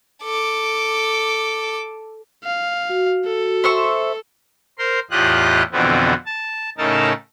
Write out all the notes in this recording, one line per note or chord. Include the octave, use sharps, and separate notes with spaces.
A4 D6
F5
F#4
A4
C5 E5 C#6
A#4 C5 C6
E2 A2 F4 G4 D#5 F#6
F2 B2 D3 E3 B3 C4
A5
A2 C#3 D#4 A4 A#4 A5